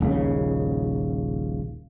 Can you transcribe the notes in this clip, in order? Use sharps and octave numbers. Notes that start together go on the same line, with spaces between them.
D#1 A#1 D#2 C#3